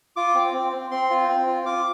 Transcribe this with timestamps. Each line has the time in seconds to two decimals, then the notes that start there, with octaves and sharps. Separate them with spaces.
0.16 F4 D6
0.35 C4
0.54 C4
0.72 C4
0.91 C4 C6
1.10 F4
1.29 C4
1.47 F4
1.66 F4 D6